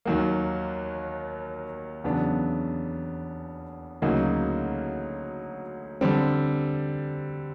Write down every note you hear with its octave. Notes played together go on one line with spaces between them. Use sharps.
D#2 D#3 F#3 A#3
E2 C#3 F#3 B3 D4
D2 C#3 F#3 A#3 D#4
D3 G3 C4